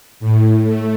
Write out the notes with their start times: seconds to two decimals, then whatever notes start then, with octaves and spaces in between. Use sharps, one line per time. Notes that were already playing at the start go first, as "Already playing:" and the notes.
0.20 A2
0.64 A3